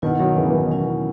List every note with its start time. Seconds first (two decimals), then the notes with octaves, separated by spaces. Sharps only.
0.02 B2 D#3 E4 B4 F#5
0.19 D#3 F#3
0.36 C#3 E3
0.50 E3
0.54 B2 D#3
0.71 F#3 C#4 E4